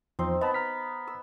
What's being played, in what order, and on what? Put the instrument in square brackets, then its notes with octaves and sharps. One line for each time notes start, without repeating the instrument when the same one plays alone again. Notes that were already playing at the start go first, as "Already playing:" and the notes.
[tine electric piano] E2 F3 C6 [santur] C4 D#4
[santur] B3 [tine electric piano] D#5 A5 B5
[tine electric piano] A#5 F6 B6
[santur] E6